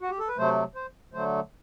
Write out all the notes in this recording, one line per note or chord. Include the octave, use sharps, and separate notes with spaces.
F#4
G4
A4
B4
C3 F#3 A3 C5
C5
D3 F#3 A3 C5